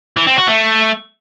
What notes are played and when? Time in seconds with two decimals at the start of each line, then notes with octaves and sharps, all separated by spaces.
0.17 E3
0.27 C4
0.37 F#4
0.47 A3